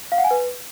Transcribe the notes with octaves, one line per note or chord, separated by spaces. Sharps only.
F5
F#5
G#5
B4